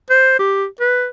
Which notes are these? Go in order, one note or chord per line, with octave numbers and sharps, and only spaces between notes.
C5
G4
B4